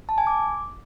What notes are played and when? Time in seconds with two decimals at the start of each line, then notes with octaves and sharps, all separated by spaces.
0.09 A5
0.18 G#5
0.27 D6